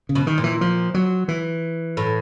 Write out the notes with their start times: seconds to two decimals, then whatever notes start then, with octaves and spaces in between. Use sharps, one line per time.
0.09 C#3
0.15 B2
0.27 D#3
0.38 A#2
0.44 E3
0.61 F3
0.94 F#3
1.28 E3
1.97 A2